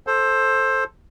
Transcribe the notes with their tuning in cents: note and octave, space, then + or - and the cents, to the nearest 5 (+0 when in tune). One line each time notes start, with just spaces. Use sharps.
A4 +0 C5 +15